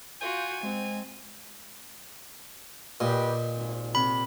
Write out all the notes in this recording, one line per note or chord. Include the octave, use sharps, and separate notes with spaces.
F4 F#4 G#5 G6
G#3 C4
A#2 G4 B4 D#5
G#1
C3 B5